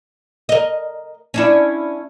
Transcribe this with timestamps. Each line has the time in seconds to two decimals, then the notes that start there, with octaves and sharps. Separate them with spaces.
0.49 A#4 D#5
1.34 C#4 D4 E4